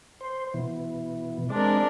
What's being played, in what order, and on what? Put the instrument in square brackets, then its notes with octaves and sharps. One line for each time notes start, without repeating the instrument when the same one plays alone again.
[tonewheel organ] C5
B2 E3
[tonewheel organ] G#3 C4 D5 [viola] D4 A#4